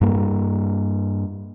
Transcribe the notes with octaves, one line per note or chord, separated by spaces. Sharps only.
G2 A#3